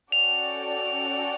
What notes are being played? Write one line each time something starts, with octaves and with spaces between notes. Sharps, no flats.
C#4 F#4 A4 D5 G5 F7